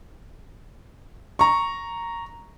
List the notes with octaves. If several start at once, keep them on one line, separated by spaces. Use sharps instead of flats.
A#5 C#6